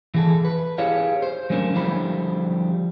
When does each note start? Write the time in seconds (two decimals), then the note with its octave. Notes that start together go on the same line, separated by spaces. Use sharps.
0.14 E3 G#4 A4
0.45 B4
0.78 E4 G4 G#4 C#5 F5
1.22 C5
1.50 F#3 A3 C#4 D4 A#4
1.74 D3 F3 G3 E4 C5 B5